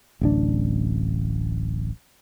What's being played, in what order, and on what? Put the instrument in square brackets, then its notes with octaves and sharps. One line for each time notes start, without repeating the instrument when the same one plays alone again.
[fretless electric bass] D1 A1 D4